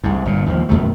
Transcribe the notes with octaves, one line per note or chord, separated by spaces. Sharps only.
C2 G#2
G1 A#2
D#2 F3
F#2 B2 D#3 A3